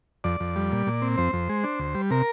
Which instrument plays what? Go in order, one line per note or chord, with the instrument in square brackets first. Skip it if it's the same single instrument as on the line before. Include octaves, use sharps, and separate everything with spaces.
[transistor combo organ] F2 D5
F2
G3
A#2
A#2
C4
F2 C5
F2
G#3
D4
D2
G3
C3 A#4